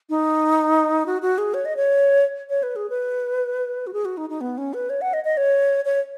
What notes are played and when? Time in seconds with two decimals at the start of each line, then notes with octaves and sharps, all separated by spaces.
0.10 D#4
1.06 F#4
1.22 F#4
1.38 G#4
1.54 C#5
1.65 D#5
1.77 C#5
2.50 C#5
2.63 B4
2.76 G#4
2.90 B4
3.87 F#4
3.93 G#4
4.05 F#4
4.17 D#4
4.30 D#4
4.41 B3
4.58 C#4
4.74 B4
4.90 C#5
5.01 F#5
5.13 D#5
5.25 D#5
5.37 C#5
5.85 C#5